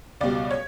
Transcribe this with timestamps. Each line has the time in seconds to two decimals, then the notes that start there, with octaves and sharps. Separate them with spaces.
0.21 C#2 B2 G3 D5
0.51 C#5